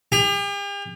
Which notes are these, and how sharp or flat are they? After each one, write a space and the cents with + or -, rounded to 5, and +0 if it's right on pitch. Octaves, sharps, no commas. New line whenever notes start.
G4 +45